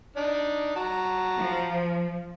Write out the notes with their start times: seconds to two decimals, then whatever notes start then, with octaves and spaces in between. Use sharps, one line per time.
0.17 D4 D#4
0.76 F#4 A5 A#5
1.38 F3